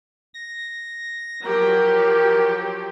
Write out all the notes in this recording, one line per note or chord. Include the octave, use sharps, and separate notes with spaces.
A#6
F3 F#3 G4 A#4